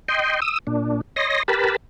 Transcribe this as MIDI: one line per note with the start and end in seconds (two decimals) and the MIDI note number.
0.08 0.40 75
0.08 0.40 79
0.08 0.40 84
0.42 0.59 87
0.42 0.59 88
0.67 1.01 46
0.67 1.01 62
1.16 1.43 73
1.16 1.43 75
1.16 1.43 84
1.16 1.43 94
1.48 1.76 67
1.48 1.76 70
1.48 1.76 71
1.48 1.76 81
1.48 1.76 83